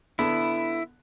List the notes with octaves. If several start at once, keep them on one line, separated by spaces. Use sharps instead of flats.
D3 B3 E4